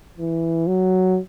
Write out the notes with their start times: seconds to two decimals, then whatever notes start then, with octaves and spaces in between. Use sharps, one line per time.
0.17 E3
0.67 F#3